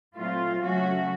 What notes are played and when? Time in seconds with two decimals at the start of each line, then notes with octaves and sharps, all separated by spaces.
0.16 A#2 F#3 A3 C4 F4
0.62 C#3 F#3 A3 C#4 F#4